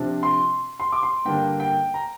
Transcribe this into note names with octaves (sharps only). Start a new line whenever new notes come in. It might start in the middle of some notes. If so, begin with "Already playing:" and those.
Already playing: C3 F3 D4
C6
C6
D6
C6
G2 D3 A#3 D4 G5
G5
A#5